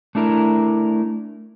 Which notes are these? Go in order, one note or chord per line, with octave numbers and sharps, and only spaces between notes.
A3 D4 E4 A#4